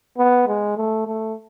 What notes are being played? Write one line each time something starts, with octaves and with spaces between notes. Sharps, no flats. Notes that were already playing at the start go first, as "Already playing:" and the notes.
B3
G#3
A3
A3